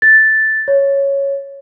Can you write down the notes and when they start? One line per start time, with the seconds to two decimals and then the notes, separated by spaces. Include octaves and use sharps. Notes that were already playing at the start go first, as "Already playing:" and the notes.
0.02 A6
0.68 C#5